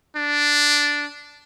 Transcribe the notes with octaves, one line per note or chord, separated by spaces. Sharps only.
D4